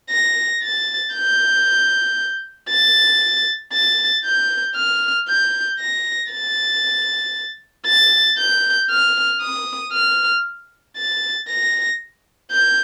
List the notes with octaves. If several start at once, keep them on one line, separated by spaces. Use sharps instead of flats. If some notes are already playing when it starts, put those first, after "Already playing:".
A#6
A6
G6
A6
A6
G6
F6
G6
A#6
A6
A6
G6
F6
D#6
F6
A6
A#6
G6